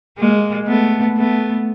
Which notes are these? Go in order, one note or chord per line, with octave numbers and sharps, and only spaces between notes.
G#3 A#3
A3 B3
A3 B3